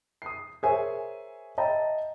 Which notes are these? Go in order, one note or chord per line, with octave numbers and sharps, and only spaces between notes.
D#6 C7
G#4 A#4 C5 C#5 E5 G#5
D#5 E5 G5 A5 A#5